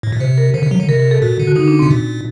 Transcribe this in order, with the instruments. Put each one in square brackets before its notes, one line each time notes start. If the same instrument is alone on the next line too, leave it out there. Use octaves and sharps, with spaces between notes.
[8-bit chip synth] A2
A#2
[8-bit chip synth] C3 [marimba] C5
[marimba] A#4
[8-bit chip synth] D3 [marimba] C5
[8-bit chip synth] C3
F#3
D3
[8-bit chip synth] C3 [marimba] A#4
[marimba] A#4
A4
[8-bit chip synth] A#2 [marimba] F#4
[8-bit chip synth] D3
[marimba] F#4
[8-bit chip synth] D3 [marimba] D#4
[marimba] D4
[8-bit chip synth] C3 [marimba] C4
[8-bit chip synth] A#2